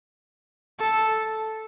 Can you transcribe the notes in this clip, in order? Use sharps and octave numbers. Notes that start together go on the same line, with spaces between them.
A4